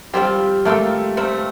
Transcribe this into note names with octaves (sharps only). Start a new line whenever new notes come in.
F3 G3 C4 F4 G4
F3 A3 A#3 F4 A4
C3 F3 A3 C4